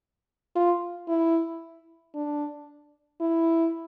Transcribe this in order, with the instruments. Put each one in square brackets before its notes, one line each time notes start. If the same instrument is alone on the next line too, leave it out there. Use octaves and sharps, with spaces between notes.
[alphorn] F4
E4
D4
E4